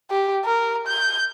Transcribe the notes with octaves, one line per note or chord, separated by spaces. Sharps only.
G4
A#4
G6